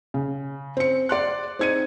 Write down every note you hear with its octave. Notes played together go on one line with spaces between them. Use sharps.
C#3
C4 C#7
D5 C6 F#6
C4 D#4 G#6 C#7 D#7